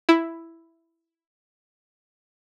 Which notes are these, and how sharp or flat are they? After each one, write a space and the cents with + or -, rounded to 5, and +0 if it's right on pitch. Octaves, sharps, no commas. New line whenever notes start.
E4 +5